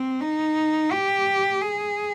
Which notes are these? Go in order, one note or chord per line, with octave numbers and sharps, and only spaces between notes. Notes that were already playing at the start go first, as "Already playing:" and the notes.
Already playing: C4
D#4
G4
G#4